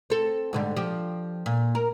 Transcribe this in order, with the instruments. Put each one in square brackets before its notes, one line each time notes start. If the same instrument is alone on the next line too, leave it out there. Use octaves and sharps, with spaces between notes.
[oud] C4 A4
G#2 D3 G3
F3 G4
A#2
A#4